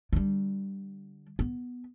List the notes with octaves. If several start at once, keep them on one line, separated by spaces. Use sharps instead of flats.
D3 G3
B3